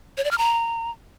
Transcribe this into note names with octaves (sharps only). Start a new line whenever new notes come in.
C#5
D5
F6
A#5